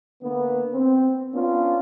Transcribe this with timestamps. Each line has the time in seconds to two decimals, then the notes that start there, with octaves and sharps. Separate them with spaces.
0.22 D3 A#3 B3
0.74 C4
1.34 B3 C#4 D4 F4